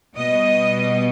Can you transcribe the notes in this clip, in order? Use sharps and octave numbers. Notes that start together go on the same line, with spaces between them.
B2 G3 B3 D#5